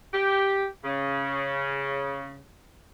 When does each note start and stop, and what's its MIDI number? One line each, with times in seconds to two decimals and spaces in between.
0.13 0.66 67
0.84 2.38 49